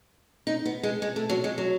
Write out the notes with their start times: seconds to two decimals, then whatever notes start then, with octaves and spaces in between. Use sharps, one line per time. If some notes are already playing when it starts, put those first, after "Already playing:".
0.47 D#4
0.66 B3
0.83 G#3
1.02 G#3
1.16 A3
1.30 F#3
1.44 G#3
1.58 F#3